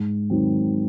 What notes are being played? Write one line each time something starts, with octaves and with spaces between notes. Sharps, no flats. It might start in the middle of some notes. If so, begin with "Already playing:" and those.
Already playing: G#2
D#3 F#3 C4